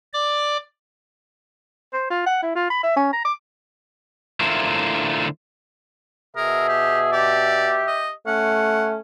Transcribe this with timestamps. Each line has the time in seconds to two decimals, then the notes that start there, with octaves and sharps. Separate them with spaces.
0.13 D5 D6
1.94 C5
2.10 F4
2.26 F#5
2.42 E4
2.55 F4
2.70 B5
2.83 E5
2.96 C#4
3.13 A#5
3.25 D6
4.40 D3 A3 E4 F4 A#4 C5
6.37 B2 G#4 A#4 E5
6.69 G4
7.13 G4 D5
7.87 D#5
8.27 A3 C#4 F#5